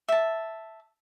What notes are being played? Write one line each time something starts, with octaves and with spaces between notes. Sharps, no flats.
E5 A5